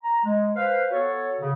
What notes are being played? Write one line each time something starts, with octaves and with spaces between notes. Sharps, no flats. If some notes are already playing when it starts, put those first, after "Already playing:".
A#5
G#3
B4 C5 F5
B3 F#4 A4 C#5
C#3